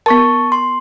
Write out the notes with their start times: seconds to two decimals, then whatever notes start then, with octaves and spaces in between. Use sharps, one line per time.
0.06 B3 A#4 A5 C#6
0.52 C6